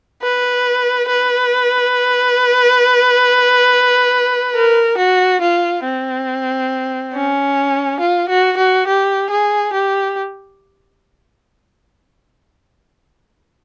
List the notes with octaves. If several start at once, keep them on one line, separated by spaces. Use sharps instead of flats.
B4
B4
A#4
F#4
F4
C4
C#4
F4
F#4
F#4
G4
G#4
G4